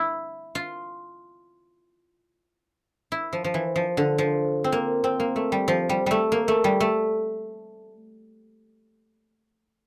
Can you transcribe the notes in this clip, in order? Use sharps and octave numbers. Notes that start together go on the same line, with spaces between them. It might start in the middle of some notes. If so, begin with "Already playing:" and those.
Already playing: E4
F4
E4
F3
F3
E3
F3
D3
F3
C4
A#3
C4
A#3
A3
G3
F3
G3
G3 A3
A#3
A3
G3
A3